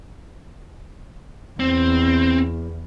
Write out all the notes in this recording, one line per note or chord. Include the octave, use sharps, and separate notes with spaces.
E2 C4